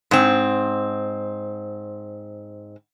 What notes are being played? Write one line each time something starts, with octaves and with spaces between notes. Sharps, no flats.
G#2 C4